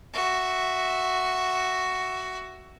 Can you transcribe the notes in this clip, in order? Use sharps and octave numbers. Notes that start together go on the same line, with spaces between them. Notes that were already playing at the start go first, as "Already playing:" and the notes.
F#4 E5